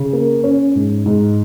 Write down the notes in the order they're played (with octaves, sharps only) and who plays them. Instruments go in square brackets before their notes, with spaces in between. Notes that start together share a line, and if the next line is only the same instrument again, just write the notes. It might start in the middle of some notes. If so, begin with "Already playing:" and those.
Already playing: [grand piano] C#3
A#3
C#4
G#2
G#2